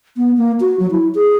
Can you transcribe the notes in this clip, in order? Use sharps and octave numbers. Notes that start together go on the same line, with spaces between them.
B3
A#3
F#4
F#3
E4
G#4